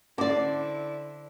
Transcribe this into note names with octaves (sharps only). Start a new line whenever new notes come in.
D3 C#4 E4 C5 D5 F#5 D6